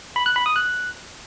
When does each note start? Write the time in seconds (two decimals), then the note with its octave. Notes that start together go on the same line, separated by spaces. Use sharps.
0.16 B5
0.26 F#6
0.36 B5
0.46 D#6
0.56 F#6